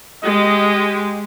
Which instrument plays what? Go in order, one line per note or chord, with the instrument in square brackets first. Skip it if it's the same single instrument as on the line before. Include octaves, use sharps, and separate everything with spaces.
[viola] G#3 G4 [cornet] D#5